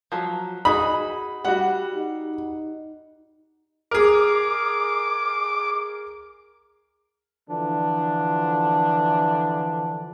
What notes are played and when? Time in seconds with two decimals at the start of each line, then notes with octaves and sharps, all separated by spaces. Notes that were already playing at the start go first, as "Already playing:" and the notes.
0.12 F3 F#3
0.65 D#4 F#4 G#4 B5 D#6
1.45 G3 F#4 G4 F#5
1.94 D#4
3.91 G#4 A#4 D6
7.49 D3 E3 F3 D4